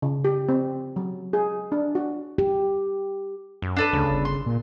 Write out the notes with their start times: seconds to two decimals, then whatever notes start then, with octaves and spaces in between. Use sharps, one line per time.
0.02 C#3
0.25 G4
0.49 C4
0.96 F#3
1.33 G#4
1.72 D4
1.95 F#4
2.38 G4
3.62 F#2
3.77 D4 A4 B4
3.93 D2 C#3
4.11 G1
4.25 C6
4.46 A#2